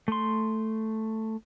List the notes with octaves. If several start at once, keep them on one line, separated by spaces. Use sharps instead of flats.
A3 C6